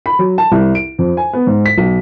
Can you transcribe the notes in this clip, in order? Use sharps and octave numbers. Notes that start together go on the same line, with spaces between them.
B5
F#3
A5
C2
D7
F2
G#5
B3
G#2
B6
B1